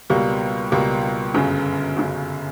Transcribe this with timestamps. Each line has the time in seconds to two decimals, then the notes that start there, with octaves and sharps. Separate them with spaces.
0.10 C#2 B2 G3 A#3
0.72 C#2 B2 G3 A#3
1.34 G1 F#2 C#3
1.97 G1 F#2 C#3